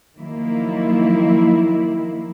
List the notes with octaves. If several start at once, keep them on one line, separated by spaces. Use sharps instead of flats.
D#3 F3 F#3 A#3 E4